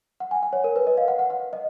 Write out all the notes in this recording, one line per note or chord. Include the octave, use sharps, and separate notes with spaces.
F#5
G#5
F#5
C#5
A#4
B4
D#5
F5
F#5
F#5
F#5
D#5